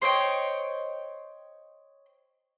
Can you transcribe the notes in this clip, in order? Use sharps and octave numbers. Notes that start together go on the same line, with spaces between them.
C5 C#5 D#5 G5